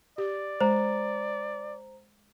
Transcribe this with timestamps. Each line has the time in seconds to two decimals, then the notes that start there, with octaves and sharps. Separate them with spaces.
0.18 G4 D5
0.61 G#3 C5 A#5